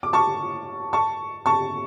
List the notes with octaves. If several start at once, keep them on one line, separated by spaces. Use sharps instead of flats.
D6
A5 C#6
A5 C#6
A5 C#6